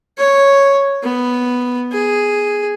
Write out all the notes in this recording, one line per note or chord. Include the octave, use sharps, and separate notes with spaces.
C#5
B3
G#4